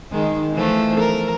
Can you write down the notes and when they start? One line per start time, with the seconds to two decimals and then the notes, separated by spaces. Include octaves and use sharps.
0.11 D#3 G#3
0.53 E3 F3 A3
1.00 A#4